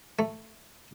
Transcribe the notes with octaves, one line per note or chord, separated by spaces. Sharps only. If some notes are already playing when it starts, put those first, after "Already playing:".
A3